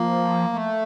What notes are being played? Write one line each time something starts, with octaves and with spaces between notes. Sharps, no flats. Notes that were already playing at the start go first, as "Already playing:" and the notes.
Already playing: F3 A#3
A3